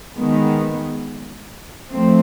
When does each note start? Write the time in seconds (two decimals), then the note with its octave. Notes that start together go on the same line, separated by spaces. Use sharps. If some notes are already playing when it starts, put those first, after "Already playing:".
0.15 D#3 G#3 B3
1.91 F3 A3 C4